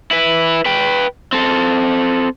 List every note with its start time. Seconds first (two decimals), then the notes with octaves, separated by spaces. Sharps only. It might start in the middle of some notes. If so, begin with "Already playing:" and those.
0.11 E4 B4
0.65 B4 G5
1.33 C4 A4